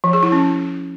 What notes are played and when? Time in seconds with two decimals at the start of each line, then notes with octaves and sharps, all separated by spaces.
0.04 F3
0.13 G#4
0.23 E4
0.32 C#4